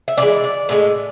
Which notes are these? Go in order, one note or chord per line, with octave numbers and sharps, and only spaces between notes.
E5
A2 E3 G#3 D5
D5
A2 E3 G#3